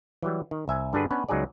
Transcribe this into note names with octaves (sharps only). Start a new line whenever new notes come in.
E3 F#3 G3
D#3
C2 E5 G#5
G2 D3 D4 F#4 G#4 B4
B3 C#4 D4 B4 C#5
C#2 F#3 D#4 G#4 D5